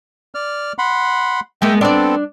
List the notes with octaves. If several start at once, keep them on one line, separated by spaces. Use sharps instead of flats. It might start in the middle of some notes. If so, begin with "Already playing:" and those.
D5 F6
F#5 B5 C6
G#3 A#3 B3 E5 G5
B3 C4 D4 A4 D5